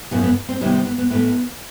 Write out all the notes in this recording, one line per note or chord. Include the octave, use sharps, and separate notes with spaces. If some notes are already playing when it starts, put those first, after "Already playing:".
F#2 C#3 F3 B3
B3
C4
C3 D#3 G3 B3 C#4
C4
B3
B3
A2 E3 A3 B3